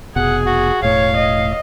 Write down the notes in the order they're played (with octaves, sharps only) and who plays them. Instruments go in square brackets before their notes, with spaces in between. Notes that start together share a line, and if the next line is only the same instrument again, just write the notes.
[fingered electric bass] F1 B2 [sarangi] G#4 [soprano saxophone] F#5
[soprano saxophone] F#4
[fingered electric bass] E1 A2 [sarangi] C#5 [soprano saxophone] F5
[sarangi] D#5